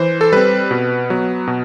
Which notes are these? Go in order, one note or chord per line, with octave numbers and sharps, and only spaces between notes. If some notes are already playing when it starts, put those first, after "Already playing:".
Already playing: E3 C5
A4
G3 C4 B4
B2
F#3 B3
B2